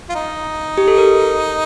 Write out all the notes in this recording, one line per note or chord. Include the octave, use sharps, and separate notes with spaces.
F4
D#4
G4
A4
A#4